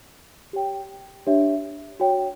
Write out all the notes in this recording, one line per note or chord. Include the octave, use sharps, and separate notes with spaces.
G4 C#5 G5
D4 G4 C#5 E5
F#4 C#5 G5